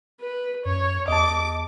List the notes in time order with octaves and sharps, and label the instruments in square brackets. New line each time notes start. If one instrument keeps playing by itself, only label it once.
[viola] B4
[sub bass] F#2 [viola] C#5
[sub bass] E2 [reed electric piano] D#5 A5 [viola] D6